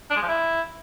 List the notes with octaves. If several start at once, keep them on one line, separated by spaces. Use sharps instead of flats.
D4
G#3
F3
E4